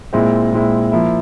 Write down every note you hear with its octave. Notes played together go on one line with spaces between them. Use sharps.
A#2 G#3 C4 E4
A#2 G#3 C4 E4
F3 A#3 E4